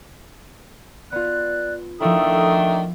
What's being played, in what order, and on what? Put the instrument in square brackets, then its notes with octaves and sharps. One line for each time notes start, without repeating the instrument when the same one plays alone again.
[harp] B3 F4 [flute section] D5 F#6
[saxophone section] D#3 A3 D4 [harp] F3 E4 [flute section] A4 D#6